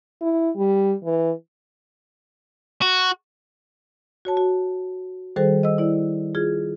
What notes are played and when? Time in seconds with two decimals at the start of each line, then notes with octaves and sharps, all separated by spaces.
0.21 E4
0.56 G3
1.05 E3
2.82 F#4
4.25 F#4 C#5 A5
4.37 F#4
5.36 D#3 G3 G#4 A4 C5
5.63 D#5 E6
5.78 E4 D5
6.35 F4 G#4 G#6